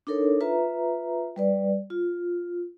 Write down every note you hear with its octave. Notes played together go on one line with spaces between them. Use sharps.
D4 D#4 A4 A#4 C#5
F4 B4 E5 A#5
G3 B4 D5
F4